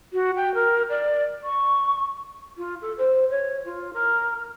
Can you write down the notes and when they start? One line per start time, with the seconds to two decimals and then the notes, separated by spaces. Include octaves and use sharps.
0.13 F#4
0.36 G5
0.55 A#4
0.90 D5
1.44 C#6
2.58 F4
2.81 A4
2.98 C5
3.30 C#5
3.65 F4
3.93 A#4